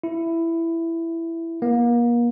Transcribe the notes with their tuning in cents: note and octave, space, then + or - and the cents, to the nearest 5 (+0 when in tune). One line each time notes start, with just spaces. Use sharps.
E4 +10
A#3 +35